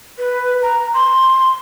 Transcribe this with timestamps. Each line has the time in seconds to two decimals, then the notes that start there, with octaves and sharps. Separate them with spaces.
0.19 B4
0.62 A#5
0.94 C6